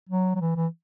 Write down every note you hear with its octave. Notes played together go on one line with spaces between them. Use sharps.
F#3
F#3
E3
E3